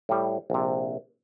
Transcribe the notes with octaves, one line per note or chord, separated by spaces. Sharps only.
A2 G3
A#1 C3